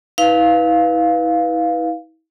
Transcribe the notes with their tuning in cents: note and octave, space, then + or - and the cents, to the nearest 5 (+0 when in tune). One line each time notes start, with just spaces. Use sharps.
E4 -40 B4 -5 F5 +0